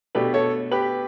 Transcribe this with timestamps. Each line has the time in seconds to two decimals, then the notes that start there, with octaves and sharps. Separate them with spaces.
0.15 B2 A3 D4 G4 B4
0.34 A4 C#5
0.71 G4 B4